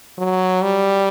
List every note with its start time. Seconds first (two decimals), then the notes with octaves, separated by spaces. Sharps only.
0.18 F#3
0.62 G3